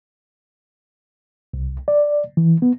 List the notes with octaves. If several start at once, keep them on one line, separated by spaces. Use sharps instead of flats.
C2
D5
E3
B3